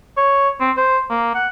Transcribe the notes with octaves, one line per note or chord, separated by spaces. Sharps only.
C#5
C4
C5
A#3
F#5